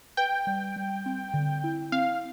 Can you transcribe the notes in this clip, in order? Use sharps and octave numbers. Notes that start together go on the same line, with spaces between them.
B4 G5
G3
G3
C4
D3
E4
C4 F5